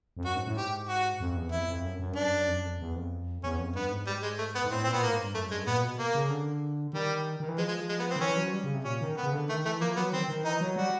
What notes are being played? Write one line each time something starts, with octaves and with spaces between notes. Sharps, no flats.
F2
F#2 F#4
G#2
A2
G#2 G4
F#4
F2
E2
F2 E4
F2
F#2
F#2
G2 D4
F#2
F2
F#2
F2
E2
F2
E2 C#4
F2
G2 B3
G#2
G3
G#3
A3
B3
G#2
A2 C4
A#2 C4
B3
A2 A#3
G#2
G2
F#2 A3
G2 G#3
A#2 B3
B2
A#3
C#3
D3
D#3 G3
D#3
E3
F3 G#3
G#3
G#3
B3
C4
D#3
E3 C#4
F#3
G3
C#3
C3
A#2 C#4
D#3
B3
C#3
D3
D#3 A3
E3 A3
F3 A#3
F#3 B3
D#3 C4
D#3
E3 D#4
F#3
G3 F#4